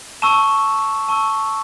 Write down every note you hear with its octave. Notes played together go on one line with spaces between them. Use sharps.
A5 C#6 E6 E7
A5 C#6 E6